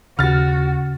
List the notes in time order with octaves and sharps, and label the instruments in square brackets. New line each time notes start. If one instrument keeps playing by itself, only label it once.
[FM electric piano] D#2 [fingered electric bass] C#3 [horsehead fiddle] F#4 [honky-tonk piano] F6 A6